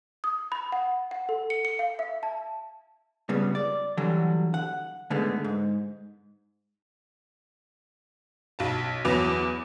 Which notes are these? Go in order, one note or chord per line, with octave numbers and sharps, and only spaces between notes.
D#6
B5
F#5
F#5
A4
C#7
C#7
F5
E5
A5
G2 A#2 C#3 G3 B3
D5
D3 E3 F#3 G3
F#5
G#2 D3 G#3 A3 B3
G#2
B1 A5
E2 F#3 B4 D6 F7